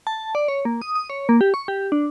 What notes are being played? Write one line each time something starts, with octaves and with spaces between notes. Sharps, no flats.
A5
D5
C#5
A#3
D#6
D#6
C#5
A#3
G4
C#6
G4
D4